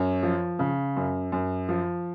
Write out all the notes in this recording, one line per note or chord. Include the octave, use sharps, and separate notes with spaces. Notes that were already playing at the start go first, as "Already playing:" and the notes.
Already playing: F#2 C#5
F3
C#3
F#2
F#2
F3